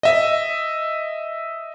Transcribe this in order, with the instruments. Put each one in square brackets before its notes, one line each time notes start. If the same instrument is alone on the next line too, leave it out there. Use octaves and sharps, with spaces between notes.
[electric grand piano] D#5 E5